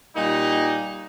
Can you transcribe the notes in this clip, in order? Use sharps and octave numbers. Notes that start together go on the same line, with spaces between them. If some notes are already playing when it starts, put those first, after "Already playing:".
A#2 G3 A#3 D#4